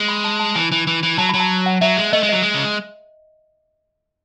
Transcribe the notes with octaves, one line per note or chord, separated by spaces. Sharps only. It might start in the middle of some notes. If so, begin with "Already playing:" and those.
Already playing: G#3
B5
A5
A5
E3 G#5
E3
E3
E3
F#3 A5
B5
F#3
A5
F#5
F#3 E5
G#3
A3 D#5
G#3
F#3 D#5
G#3
C#3